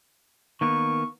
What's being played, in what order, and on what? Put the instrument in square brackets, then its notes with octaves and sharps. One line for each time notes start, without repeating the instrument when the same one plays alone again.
[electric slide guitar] D#3 A#3 B3 [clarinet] C#6